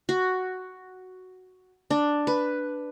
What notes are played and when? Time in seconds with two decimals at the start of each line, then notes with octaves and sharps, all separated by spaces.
0.09 F#4
1.91 D4
2.27 B4